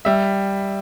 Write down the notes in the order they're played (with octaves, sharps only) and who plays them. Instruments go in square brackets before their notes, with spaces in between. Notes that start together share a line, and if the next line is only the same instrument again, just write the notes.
[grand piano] G3 E5